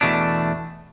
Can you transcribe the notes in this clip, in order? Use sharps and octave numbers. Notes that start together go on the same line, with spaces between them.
E2 B2 A3 D4